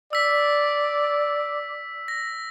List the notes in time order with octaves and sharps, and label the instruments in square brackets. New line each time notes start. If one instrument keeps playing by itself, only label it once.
[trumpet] D5 [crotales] E6 B6
[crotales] A#6